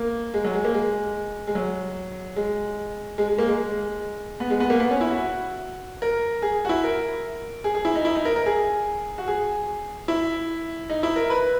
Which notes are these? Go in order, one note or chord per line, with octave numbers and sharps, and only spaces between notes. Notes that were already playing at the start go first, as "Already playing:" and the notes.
Already playing: A#3
G#3
F#3
G#3
A#3
G#3
G#3
F#3
G#3
G#3
G#3
A#3
G#3
G#3
B3
G#3
B3
A#3
B3
C#4
E4
F#4
A#4
G#4
F#4
E4
A#4
G#4
G#4
E4
D#4
E4
D#4
A#4
A#4
G#4
F#4
G#4
E4
D#4
E4
A#4
B4